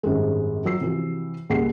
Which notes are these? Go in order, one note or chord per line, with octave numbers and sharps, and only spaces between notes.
G#1 F#2 G3 G#3
F#3 E6 C7
C3 E3 F3 F#4
C#2 A#2 G3 G#4 F#5 C7